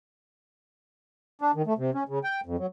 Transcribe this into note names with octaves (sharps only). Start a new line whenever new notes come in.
D4
D#3
A3
C3
C#4
C#3
G5
F2
F#3